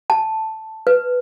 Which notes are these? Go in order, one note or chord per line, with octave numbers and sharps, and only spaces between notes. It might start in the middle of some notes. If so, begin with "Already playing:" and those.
A5
B4